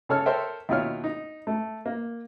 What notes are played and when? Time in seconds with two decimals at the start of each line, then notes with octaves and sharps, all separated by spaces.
0.09 C#3 A4 C#5 F6
0.26 A4 A#4 C5 C#5 E5 G5
0.69 D#2 B2 E4 F4 C#5 F6
1.04 D#4
1.47 A3
1.86 A#3